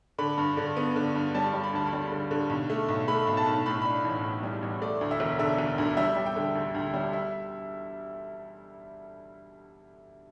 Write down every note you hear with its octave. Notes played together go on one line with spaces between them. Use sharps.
D3 B5
G2
D3
B3
D3
G2
G3 A5
G3
B5
D2 A5
B5
G3
D3
D3
B1
A3
B1
A3 B5
B1
A5
B1
A2 B5
D4 B5
A1
A2
G3
A1
A3 D5
D2
E5
E1
D3 E5
E1
D2
G3 E5
G3
G5
D3
D2
D2
G3
E5